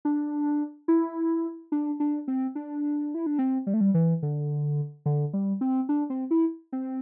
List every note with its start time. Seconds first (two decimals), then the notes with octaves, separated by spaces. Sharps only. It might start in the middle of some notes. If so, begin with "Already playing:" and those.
0.05 D4
0.88 E4
1.72 D4
2.00 D4
2.28 C4
2.55 D4
3.14 E4
3.26 D4
3.39 C4
3.67 G3
3.74 A3
3.81 G3
3.94 E3
4.22 D3
5.06 D3
5.33 G3
5.61 C4
5.89 D4
6.10 C4
6.31 E4
6.73 C4